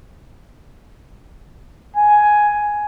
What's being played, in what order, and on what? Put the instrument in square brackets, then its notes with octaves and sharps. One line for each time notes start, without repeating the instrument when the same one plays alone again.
[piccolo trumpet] G#5